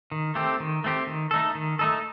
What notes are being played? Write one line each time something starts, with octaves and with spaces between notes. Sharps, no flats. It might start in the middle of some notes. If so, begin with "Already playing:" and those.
D#3
A3 C4 G4
D#3
A3 C4 G4
D#3
A3 D#4 A4
D#3
A3 D#4 A4